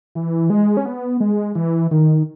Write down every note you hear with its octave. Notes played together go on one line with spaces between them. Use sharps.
E3
G#3
C#4
B3
G#3
E3
D#3